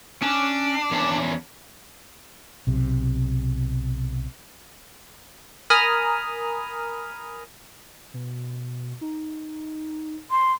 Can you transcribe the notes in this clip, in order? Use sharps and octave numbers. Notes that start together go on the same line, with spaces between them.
C#4 D4
E2 C#4 A5
B1 C3
A#4 G#5 A#5 B5 D#6 F6
B2
D#4
C6